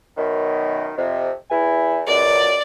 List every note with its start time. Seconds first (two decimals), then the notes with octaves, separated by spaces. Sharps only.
0.17 F#2 B2 D#3
0.98 F2 C3
1.51 E2 E4 G#5
2.07 C#2 F#2 D5